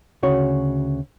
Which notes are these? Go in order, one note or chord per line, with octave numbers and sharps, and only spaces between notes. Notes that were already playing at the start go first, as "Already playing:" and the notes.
D2 C#3 F#4 C#5